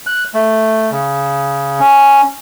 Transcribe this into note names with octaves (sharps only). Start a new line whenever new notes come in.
F#6
A3
C#3
C#4